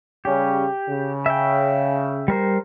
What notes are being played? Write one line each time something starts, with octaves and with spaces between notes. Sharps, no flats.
C#3 G3 C#4 G4
C#3
E5 G5
G3 A#4 C5